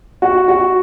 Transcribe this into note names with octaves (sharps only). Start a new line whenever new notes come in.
F#4
F#4